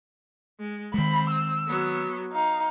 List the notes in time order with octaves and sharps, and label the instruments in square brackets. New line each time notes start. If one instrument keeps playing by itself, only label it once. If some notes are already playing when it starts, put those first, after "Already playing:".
[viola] G#3
[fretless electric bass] D#3 G#3 [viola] C4 [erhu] B5
[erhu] E6
[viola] F#3 B3
[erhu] D#4 [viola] F5